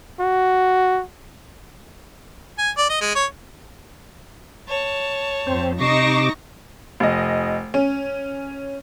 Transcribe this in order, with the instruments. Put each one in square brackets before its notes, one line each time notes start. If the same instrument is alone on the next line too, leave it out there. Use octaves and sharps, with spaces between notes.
[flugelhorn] F#4
[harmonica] G#5
D5
D#5
G#3
C#5
[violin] C#5 A5
[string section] F2 [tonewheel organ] C4 C5
[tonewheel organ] C3 D6 [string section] D#4 C#6 A#6 [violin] C7 E7
[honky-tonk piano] F1 D#5
C#4